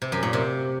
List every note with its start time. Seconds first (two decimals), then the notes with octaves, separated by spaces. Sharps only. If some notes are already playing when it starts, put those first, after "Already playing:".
0.02 C3
0.12 F#2
0.23 A#2
0.33 C3